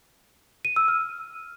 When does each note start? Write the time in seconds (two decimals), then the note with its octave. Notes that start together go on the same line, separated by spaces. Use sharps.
0.65 D#7
0.76 E6
0.88 F6